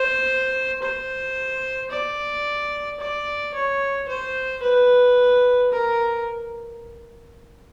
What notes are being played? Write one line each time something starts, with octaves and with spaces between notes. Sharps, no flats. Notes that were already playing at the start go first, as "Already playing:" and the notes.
Already playing: C5
C5
D5
D5
C#5
C5
B4
A#4